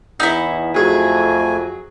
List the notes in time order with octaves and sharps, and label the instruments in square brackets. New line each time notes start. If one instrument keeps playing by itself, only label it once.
[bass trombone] E2 [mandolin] D#4 E4
[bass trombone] F2 [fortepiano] F#3 G#4 [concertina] A3 G#5